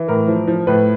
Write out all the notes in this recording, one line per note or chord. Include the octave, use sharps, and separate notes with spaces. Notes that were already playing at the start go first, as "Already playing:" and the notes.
Already playing: E3
A2 A#4
F3
F3
A2 B4